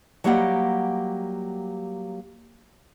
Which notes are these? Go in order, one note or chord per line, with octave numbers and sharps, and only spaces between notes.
F#3 G3 A#3 G4 D#5 F#5